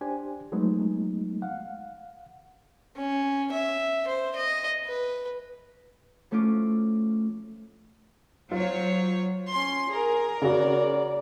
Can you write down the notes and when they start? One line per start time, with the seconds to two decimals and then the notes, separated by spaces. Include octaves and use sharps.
0.01 D4 G4 C5 G#5
0.52 F3 F#3 G#3 A3 B3 D#4
1.42 F5 F#5
2.97 C#4
3.52 E5
4.07 C5
4.36 D#5
4.86 B4
6.31 F3 A3 C#4 E4 F4 D6
8.51 F#3 F4 C5 C#5
9.51 C#4 C6
9.91 G#4 A#4
10.42 C#3 F#4 D5